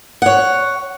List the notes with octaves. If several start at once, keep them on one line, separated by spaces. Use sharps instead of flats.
C#5 F#5